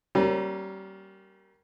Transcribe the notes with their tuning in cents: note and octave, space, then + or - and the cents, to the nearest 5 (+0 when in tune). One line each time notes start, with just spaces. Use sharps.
G3 -30 A#3 +0 C#4 -35